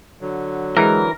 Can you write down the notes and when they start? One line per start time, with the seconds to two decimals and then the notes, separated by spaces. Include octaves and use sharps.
0.21 D3 F#3
0.77 E3 G#3 A#4